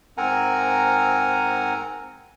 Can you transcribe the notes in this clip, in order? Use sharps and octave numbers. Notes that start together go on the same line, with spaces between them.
G#2 C4 A#4 F#5 G#5 A#5